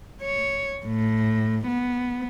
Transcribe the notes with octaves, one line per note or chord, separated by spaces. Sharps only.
C#5
A2
B3